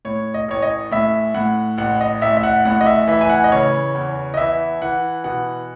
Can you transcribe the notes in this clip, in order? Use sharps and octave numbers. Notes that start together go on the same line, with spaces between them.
A2 C#5
D#5
A1 C#5
D#5
A2 E5
A2 F#5
A1 F#5
D#5
A1 E5
E5
F#5
A2 F#5
D#5
E5
E3 E5
G#5
F#5
D#5
C#3 C#5
E2
D#5
E3 E5
E3 F#5
B2 F#5